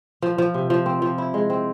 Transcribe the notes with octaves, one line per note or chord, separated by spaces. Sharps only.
F3
F3
C3
F3
C4
F3
E4
G#3
C4